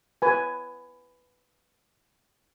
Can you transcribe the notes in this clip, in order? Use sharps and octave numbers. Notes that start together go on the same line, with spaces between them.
B4 G#5